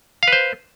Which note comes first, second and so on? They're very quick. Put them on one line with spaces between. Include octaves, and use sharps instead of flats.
F5 B4 C5